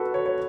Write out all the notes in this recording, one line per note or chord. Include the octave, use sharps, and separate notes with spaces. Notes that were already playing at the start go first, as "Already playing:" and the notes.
Already playing: F#4 A4 B4
C#5
C#5